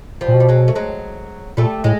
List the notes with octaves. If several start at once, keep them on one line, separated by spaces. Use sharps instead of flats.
F3 G3
A#2
B2
G3
F#3 G#3
A3
F#3 G#3
A#2 G3 A3
A2 G#3